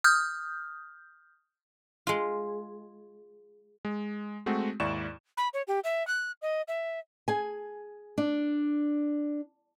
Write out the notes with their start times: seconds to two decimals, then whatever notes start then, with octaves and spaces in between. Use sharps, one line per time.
0.04 D#6 F6 G6
2.07 G#3 F4
3.85 G#3
4.46 G#3 A3 C4 F#4
4.80 D#2 G#2 E4 D5 C#6 E7
5.37 B5
5.54 C#5
5.68 G4
5.84 E5
6.07 F#6
6.42 D#5
6.68 E5
7.28 G#4 G#5
8.18 D4